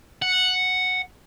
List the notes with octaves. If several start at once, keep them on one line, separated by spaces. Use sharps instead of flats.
F#5